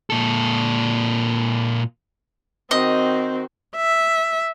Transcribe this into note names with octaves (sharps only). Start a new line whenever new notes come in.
A#2 A4
D#3 C4 F#4 D#5
E5